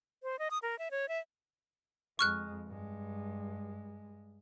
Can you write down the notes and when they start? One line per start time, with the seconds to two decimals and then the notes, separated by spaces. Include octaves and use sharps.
0.23 C5
0.39 D#5
0.51 D#6
0.63 A#4
0.79 E5
0.91 C#5
1.09 E5
2.19 F2 G#3 C#6 F6 F#6
2.67 G2 G#3